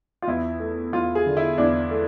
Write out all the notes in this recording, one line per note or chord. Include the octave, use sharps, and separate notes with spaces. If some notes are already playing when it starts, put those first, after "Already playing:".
F4
E2 E4
A3
E2 F4
G#4
D3
E4
E2 D4
A3